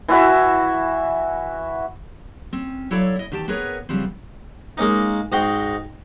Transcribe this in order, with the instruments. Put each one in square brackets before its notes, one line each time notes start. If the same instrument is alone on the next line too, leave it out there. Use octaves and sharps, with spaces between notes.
[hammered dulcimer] E3 E4 F#4 E5
[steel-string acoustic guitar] C4 C#4
F#3 E4 A4 C#5 D5 F5
E4 D#5
E2 D#3 G4 G5 A5
B3 G4 G#4 A#4 B4 C#5
C#3 F3 G3 B3 C4
[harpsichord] G#3 A#3 C#4 D#4
G#2 F#4 D#5 G5 C6